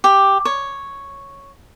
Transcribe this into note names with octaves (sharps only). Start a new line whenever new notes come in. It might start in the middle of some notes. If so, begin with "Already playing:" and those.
G4
C#5